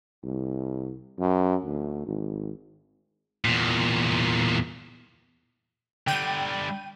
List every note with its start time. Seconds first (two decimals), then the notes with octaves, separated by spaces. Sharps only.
0.23 C2
1.19 F#2
1.65 D2
2.06 G#1
3.45 E2 A#2
6.07 D3 G3 G5 D#7